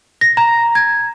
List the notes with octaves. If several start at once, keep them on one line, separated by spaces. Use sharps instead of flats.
A#6
A#5
G#6